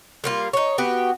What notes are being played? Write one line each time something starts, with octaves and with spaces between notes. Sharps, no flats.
G3 A#3 F4
D#4 C#5
B3 F#4 G4